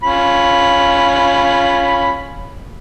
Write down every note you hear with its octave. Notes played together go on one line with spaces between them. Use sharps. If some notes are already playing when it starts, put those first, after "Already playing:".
C#4 F4 B5